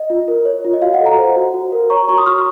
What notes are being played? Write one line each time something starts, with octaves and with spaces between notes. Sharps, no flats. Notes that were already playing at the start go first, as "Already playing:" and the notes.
Already playing: D#5
F4
A#4
C#5
F4
D#5
F#4 F5
D#5 F#5
A4
F#5 A#5
C5
F#4
F#4
A#4
C#5 A#5 C#6
F#4 A#5 C#6
C6 D#6
F#4 C#6 F6